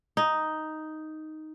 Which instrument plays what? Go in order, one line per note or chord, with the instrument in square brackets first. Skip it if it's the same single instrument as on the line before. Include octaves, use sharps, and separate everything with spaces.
[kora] D#4